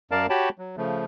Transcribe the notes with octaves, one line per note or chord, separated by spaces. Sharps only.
F#2 A#4 D5 F5 A5
F#4 G4 C#5 G5 A5 B5
F#3
C#3 F3 A3